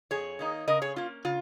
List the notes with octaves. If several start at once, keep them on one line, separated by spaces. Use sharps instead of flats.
F2 G#4 C#5
D#3 A#3 D#4
C#3 A#4 D#5
G#4 C#5
A#3 C#4 F4
C#3 F4